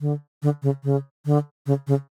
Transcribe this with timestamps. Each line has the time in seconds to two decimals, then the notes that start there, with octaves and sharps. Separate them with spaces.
0.01 D3
0.43 D3
0.63 C#3
0.84 C#3
1.25 D3
1.66 C#3
1.87 C#3